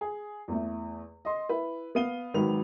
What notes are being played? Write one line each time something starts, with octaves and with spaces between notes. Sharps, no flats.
G#4
E2 A3
D#5 C6
E4 B4
B3 F5 D#7 G7
G#1 G#2 D#3 F#3 B4 F7